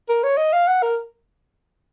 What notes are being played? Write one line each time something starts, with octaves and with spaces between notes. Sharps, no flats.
A#4
C#5
D#5
F5
F#5
A#4